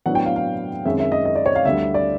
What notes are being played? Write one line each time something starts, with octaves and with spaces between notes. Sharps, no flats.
A2 F#3 B3 D4 F#5
G5
F5
F5
F#2 D#3 G#3 C4 E5
E5
D#5
D#5
D5
C#5
F5
D2 D3 G3 E5
D5